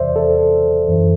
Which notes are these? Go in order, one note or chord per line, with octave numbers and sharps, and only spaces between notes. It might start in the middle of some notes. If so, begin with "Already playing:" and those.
Already playing: E2 C3 E3 C5 D5 E5
A4
F#2 E3